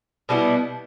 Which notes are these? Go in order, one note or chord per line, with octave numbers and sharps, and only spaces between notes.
B2 G3 B3 E4